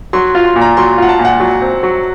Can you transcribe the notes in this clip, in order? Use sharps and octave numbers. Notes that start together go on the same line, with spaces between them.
F#3 C6
F4
C6
A#2
A#5
F#3 C6
F4 F#5
A5
A#2
F#5
F#3
C4
F#3